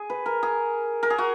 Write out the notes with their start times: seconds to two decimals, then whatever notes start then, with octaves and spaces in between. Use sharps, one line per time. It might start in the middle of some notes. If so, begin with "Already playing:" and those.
Already playing: G#4
0.10 B4
0.26 A#4
0.43 G#4
1.03 A#4
1.10 G#4
1.18 F#4